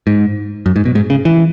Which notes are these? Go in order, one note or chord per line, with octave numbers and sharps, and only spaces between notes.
G#2
F#2
G#2
B2
G#2
C#3
E3